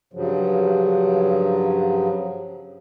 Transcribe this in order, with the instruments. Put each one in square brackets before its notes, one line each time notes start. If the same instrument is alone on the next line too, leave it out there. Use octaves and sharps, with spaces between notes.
[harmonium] G2 C#3 F3 F#3